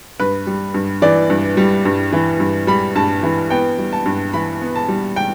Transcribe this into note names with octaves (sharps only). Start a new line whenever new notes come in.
G2 B4
G3
G2
E3 D5
G2
G3
G2
E3
G2
G3 B5
G2 A5
E3
B3 G5
G3
A5
G2
E3 B5
B3
A5
G3
G5